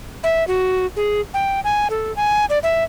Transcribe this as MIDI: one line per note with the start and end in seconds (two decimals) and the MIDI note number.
0.23 0.46 76
0.48 0.86 66
0.96 1.21 68
1.34 1.60 79
1.64 1.88 80
1.90 2.14 69
2.16 2.46 80
2.50 2.59 74
2.63 2.84 76